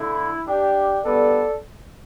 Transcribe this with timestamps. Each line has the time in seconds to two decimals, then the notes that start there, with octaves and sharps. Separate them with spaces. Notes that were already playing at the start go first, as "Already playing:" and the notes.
Already playing: D3 A3 E4
0.46 D4 G4
1.03 G2 D3 B3 A4 D5